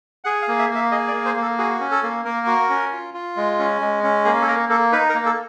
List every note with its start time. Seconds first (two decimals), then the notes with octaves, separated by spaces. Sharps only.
0.24 G#4 F#5
0.42 F5
0.48 A#3
0.59 E5
0.70 A#3 E5
0.92 G#4 D#5
1.08 D5
1.13 A#3
1.25 C5
1.37 A#3
1.42 A4
1.58 F#4 G#4
1.80 C#4
1.91 A4
2.03 A#3
2.25 A#3 A#4
2.47 F#4
2.69 C#4
2.92 F4
3.14 F4
3.37 G#3
3.59 C#4
3.81 G#3
4.03 C#4
4.25 A#3 G#4
4.42 A4
4.47 A#3 A#4
4.69 A#3 A4
4.92 D#4 B4
5.09 A#4
5.14 A#3
5.26 A4